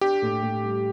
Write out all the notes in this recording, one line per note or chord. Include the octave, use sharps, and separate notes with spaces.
D4 G4
A2
A2
G3